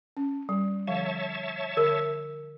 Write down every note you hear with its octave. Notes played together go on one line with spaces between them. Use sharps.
C#4
G3
D3 F3 C#5 E5 F5 A5
D3 A#4